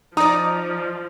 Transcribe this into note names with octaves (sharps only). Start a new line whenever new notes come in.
F3 D#4 D5 A#5 D#6